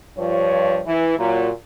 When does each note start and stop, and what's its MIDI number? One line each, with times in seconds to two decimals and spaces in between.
0.17 0.79 43
0.17 0.79 53
0.17 0.79 73
0.85 1.17 52
1.18 1.50 46
1.18 1.50 54